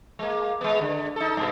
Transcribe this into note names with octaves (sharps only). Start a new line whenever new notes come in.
G#3 A#3
G#3 B3
D3
D#4 A4
G2 B2